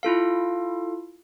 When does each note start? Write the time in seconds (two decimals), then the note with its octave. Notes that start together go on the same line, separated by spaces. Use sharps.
0.03 E4 F4 A4 F5